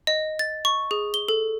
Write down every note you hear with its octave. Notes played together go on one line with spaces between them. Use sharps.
D#5
A6
C#6
G#4
G7
A4